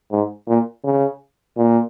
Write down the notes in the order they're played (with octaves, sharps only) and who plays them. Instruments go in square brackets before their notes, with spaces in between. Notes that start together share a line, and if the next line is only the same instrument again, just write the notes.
[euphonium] G#2
A#2
C#3
A#2